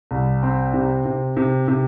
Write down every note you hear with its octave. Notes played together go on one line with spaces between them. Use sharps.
C2
C4
C3
C3
C3
C3